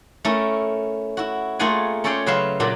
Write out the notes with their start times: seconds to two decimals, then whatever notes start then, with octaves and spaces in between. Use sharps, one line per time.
0.25 A3 C#4 E4 A4 A#4
1.17 E4 F#4
1.59 A3 A#3 F4 G#4 F#5 G#5
2.04 C#4 A4 C#5 D5 G5 C6
2.26 C#3 F#3 B4 E5 F5 C6
2.60 A#2 F#3 A#3 D4 A4